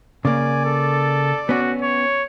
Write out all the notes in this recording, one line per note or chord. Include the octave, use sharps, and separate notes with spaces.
C#3 A#3 D5 G#5
A4
B3 C#4 F#4
C#5